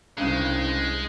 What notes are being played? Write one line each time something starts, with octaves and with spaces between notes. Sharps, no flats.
C2 G2 C#3 G#3